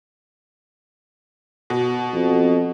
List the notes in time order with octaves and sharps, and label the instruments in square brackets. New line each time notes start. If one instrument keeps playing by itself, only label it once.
[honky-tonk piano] B2
[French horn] F2